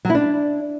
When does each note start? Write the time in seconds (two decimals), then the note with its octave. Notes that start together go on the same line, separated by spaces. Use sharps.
0.05 F#3
0.10 E4
0.15 D4